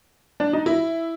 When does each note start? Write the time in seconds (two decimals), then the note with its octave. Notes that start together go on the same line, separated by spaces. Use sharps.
0.40 D4
0.53 D#4
0.66 E4